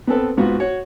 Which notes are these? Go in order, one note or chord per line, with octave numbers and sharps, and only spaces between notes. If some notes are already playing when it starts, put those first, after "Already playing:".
B3 C4 A4 B4
G#2 B3 F4 F#4 C#6
F#4 C#5